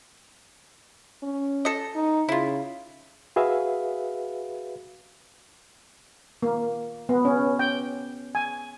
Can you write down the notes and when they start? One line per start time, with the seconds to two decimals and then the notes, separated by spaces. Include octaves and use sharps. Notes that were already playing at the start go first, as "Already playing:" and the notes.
1.23 C#4
1.65 A4 D#5
1.95 D#4
2.29 C#3 E4 F4
3.36 F#4 G#4 B4 E5 F5
6.43 A#3
7.09 B3
7.25 C#4
7.59 G5
8.35 G#5